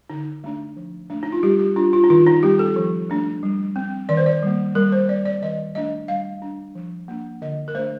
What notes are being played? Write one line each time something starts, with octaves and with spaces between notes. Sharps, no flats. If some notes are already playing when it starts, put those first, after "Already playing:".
D3 D#4
A3 D4
F3
A3 D4
D#4
F4
G3 G4
G4
D4 F4
F4
D#4
D#3 F4
D#4
G3 C4 G4
A4
F3
A3 D4
G3
C4
D#3 D5
C5
D5
G3 A#3
G3 A#4
C5
C4 D5
D5
D#3 D#5
A3 D4 D#5
G3 F5
D4
F3
A#3 D4
D3 D#5
A#4
A3 D4 C5